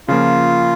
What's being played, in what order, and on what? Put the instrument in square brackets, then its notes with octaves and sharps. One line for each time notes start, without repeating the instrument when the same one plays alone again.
[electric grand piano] C#3 F3 A#3 [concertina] F4